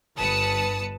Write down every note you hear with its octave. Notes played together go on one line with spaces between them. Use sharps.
G1 B4 A5 D#6 C#7